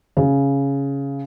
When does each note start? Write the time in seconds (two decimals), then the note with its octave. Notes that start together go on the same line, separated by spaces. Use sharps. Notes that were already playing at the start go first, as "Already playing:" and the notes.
0.17 C#3